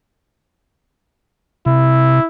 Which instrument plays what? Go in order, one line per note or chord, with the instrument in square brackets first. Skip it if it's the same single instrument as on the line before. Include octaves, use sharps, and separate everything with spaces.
[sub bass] C3 [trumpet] E4